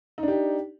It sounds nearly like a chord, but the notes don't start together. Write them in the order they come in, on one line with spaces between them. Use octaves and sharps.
D#4 D4 G4